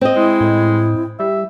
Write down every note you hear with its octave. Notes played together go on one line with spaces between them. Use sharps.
C4 D#5
G#3 E4
A2
G3 E5